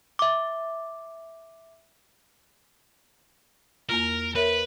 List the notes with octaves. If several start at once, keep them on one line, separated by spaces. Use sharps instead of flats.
E5 D6
E2 A#3 F4 A#4
A#4 B4 C#5 E5